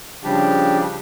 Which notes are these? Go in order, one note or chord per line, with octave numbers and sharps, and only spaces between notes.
C#3 F3 G3 D4 G4